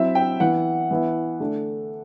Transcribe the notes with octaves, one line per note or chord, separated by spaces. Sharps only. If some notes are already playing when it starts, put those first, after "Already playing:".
Already playing: F#3 C4 E4 E5
G5
E3 B3 E4 F#5
E3 B3 E4
D3 A3 D4